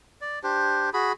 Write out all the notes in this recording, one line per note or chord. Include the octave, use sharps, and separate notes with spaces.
D5
D4 G4 C5
F#4 G#4 B5